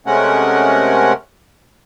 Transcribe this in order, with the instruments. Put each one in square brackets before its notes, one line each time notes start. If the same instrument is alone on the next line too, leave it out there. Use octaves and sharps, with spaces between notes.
[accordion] C3 G#3 A3 C#4 A#4 F#5